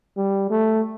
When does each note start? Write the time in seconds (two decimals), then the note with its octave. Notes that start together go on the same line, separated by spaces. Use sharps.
0.17 G3
0.51 A3